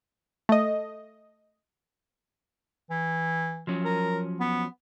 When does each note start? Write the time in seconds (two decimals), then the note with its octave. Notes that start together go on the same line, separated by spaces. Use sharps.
0.49 A3 D#5
2.90 E3
3.67 F3 F#3 C#4
3.85 A#4
4.40 B3